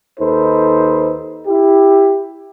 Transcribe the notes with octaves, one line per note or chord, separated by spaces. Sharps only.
D#2 D#4 A4 B4 C5
E4 G4